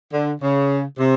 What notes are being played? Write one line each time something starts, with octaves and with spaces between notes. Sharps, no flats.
D3
C#3
C3